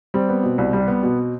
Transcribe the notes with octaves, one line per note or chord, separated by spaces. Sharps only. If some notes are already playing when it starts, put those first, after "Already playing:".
G3 C4
B3
B2
C2
G3
B3
B2